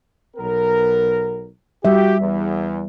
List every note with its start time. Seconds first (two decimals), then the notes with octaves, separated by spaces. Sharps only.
0.37 B1 B3 A#4
1.85 G3 F#4 G4 E5
2.19 E2